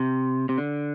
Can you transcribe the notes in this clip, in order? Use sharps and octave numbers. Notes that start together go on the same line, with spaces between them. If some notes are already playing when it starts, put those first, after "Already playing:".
Already playing: C3
C3
D3